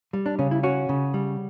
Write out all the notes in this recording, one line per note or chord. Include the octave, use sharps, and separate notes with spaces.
G3
D4
C#3 C#4
E4
C#4 F#4
C#3
G3